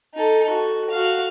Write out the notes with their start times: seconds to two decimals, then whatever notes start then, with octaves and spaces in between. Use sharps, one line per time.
0.15 D#4 A4
0.50 F#4
0.90 F#4 F5